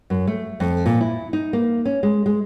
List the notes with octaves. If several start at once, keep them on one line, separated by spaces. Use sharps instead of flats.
F#2
A3
F2
A#2
E4
D#4
A#3
C#4
G#3
G#3